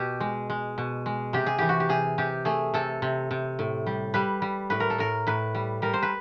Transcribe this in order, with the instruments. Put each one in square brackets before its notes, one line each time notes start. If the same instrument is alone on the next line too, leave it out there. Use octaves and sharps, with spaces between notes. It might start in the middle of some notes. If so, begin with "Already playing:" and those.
Already playing: [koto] B2 G4
G#3
G#3
B2
G#3
C3 G4
G#4
E3 G4
F#4
G4
C3 G#4
C3 G4
A3 G#4
C3 A4
C3
C3
A2
G3
G3 B4
G3
A2 B4
A#4
A4
A2 A#4
A2 B4
G3
G3 A#4
C5
B4